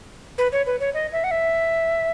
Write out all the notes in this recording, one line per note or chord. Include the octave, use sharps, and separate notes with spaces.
B4
C#5
B4
C#5
D#5
E5
F#5
E5